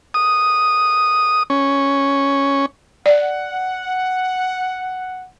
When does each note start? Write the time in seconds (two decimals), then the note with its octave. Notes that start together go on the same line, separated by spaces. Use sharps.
0.14 D#6
1.50 C#4
3.06 D5 F#5